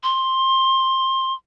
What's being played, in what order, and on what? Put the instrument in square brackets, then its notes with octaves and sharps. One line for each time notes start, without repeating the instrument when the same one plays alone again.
[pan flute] C6